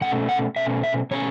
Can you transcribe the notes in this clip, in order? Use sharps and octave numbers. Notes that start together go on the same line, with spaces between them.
B2 A3 C#4 F#5
F#5
B2 A3 C#4 E5
E5
B2 A3 C#4 C#5